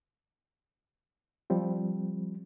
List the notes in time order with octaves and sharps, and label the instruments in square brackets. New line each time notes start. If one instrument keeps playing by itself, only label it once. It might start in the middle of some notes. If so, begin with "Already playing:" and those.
[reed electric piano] F3 G3 C4